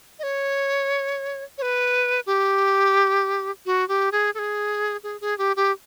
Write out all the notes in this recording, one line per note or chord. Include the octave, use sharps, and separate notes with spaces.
D#5
C#5
C#5
B4
G4
F#4
G4
G#4
A4
G#4
G#4
G#4
G4
G4